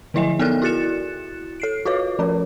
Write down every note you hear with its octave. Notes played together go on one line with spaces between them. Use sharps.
D3 F3 E4 D#5 E5 G#5
B3 A4 A#4 D5 F6 F#6
E4 F#4 F#6 A6 C#7 E7
A4 C7 D7
F4 F#4 B4 C#5 D6
F3 C#4 A#4